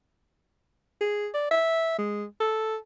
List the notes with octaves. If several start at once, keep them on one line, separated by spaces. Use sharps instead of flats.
G#4
D5
E5
G#3
A4